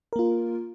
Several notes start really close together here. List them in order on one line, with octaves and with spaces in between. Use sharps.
A#4 A#3 F4